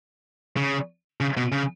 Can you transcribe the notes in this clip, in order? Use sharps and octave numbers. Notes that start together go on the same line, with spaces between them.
C#3
C#3
B2
C#3